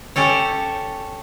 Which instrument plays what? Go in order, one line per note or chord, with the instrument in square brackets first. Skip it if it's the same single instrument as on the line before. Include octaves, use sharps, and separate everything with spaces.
[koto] C#4 G4 A4 C#5